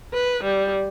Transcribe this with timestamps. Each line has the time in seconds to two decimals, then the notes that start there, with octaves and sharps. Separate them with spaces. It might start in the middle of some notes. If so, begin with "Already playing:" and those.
0.14 B4
0.44 G3